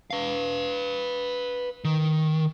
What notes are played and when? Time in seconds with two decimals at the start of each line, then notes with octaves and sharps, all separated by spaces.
0.10 B4 F5
1.84 D#3